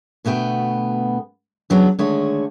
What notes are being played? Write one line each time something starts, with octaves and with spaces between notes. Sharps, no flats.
D2 B2 A3 B3 G5
E2 C#3 F#3 G#3 B3 D4
D3 D#3 G#3 A3 C#5 D5